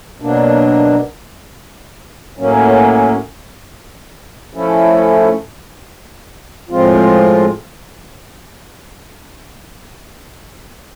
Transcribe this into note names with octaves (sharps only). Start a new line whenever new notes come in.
B2 F#3 A#3 D4
A2 F#3 A#3 C#4
F3 A3 C#4 E4 A4
A2 F3 G#3 C4 F4